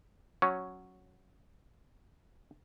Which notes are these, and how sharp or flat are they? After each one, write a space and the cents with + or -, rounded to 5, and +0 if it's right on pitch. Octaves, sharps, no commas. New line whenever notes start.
F#3 +0 C#4 +0